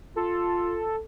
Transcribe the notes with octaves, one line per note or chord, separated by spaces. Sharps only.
F4 A4